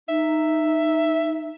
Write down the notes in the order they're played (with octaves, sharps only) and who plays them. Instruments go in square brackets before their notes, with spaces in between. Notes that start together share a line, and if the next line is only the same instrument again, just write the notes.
[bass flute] D#4 [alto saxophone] E5